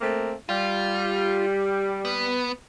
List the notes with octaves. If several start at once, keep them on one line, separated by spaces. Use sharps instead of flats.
A3 A#3 C4
G3 F4
B3